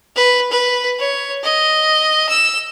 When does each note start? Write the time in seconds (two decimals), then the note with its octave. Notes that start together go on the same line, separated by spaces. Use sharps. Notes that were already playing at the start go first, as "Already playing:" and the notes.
0.16 B4
0.51 B4
0.99 C#5
1.43 D#5
2.28 E6